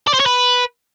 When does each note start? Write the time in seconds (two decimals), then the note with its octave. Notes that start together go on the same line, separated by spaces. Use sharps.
0.07 D5
0.14 C5
0.20 C#5
0.26 B4